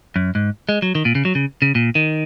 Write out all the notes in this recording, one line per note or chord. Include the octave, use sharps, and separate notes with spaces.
F#2
G#2
G#3
F#3
D#3
A#2
C#3
F#3
C#3
C#3
A#2
D#3